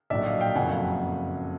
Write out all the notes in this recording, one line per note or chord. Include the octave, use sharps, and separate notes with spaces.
A#1 A2 F#3 D5 E5
D#5 F5
F5 G5
F#1 F2 C#3 F#3 F#5 G#5